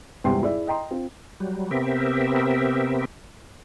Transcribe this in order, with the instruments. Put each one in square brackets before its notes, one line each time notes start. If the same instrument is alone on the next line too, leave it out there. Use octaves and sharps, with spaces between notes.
[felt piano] G#1 E2 G2 C3 G5 C6
E4 G#4 D5 E5
D#5 G5 A#5 C6
C4 F4
[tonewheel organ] F#3 G3
C3 B3 C4 G4 A#4 E5